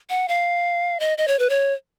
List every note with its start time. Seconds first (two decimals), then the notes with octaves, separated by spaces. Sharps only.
0.10 F#5
0.28 F5
1.00 D#5
1.18 D#5
1.28 C#5
1.39 B4
1.50 C#5